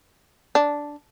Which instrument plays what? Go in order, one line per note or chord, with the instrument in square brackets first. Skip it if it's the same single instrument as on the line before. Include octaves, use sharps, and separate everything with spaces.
[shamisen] D4